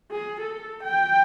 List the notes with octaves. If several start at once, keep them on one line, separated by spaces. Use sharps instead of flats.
G#4
A4
G5